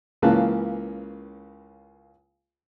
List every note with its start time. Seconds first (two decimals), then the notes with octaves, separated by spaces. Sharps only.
0.22 C#2 C#3 E3 A#3 A5 F#6